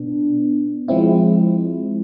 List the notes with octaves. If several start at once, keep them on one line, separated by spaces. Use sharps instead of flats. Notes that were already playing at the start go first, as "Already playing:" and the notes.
Already playing: B2 B3 D4
F3 G#3 C4 E4